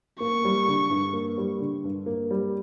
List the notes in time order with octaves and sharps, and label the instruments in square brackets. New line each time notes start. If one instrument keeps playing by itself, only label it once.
[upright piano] A#3 [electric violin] C#6
[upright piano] G3
D3
G2
A#3
G3
D3
G2
A#3
G3